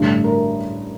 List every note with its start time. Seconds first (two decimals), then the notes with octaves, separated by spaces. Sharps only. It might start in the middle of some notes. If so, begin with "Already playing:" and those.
Already playing: A1 G2 D3
0.24 A#4